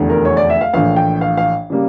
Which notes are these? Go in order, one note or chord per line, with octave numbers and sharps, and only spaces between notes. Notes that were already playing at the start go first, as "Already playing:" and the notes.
Already playing: F1 E2 D3
A#4
C#5
D5
E5
F5
A#1 A2 E3 F5
G5
F5
F5
C#3 G3 A#3